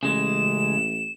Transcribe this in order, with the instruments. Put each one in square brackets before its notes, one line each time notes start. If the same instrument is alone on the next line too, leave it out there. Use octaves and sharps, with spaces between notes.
[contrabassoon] A1 [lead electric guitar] C#3 G#3 [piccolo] E7